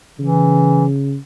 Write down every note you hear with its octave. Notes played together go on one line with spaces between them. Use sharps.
C#3 E3